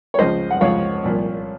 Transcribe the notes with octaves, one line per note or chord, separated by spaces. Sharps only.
C#5
C#2 C#3 F3 C5 D#5
F#5
C#2 C#3 F3 C#5 F5
C2 A#2 F3